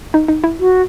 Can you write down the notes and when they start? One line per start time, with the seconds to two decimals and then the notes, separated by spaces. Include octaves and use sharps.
0.14 D#4
0.28 D#4
0.44 E4
0.59 F#4